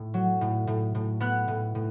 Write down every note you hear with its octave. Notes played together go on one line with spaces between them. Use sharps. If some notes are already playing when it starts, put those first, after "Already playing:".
Already playing: A2
F#3
A2
A2
A2
B3 F#6
A2
A2